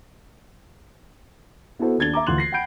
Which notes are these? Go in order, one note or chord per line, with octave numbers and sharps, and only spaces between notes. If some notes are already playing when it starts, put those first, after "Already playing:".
B3 E4 F#4 A4 C5
D#1 D4 G#6 A6 G7
E5 A#5 D6
D2 E3 F4 C6 F#6 F#7
A#6 C7
F#5 G5 B5 G6 D7